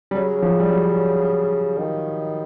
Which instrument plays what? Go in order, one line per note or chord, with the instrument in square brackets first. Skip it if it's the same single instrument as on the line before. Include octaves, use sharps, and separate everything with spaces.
[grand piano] G3
[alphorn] C#3 [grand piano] F#3
[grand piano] F3
G3
F#3
[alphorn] D#3